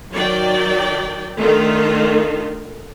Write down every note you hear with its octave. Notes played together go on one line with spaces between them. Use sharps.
D#3 F#3 D5 G5
D3 D#3 A3 F4 A4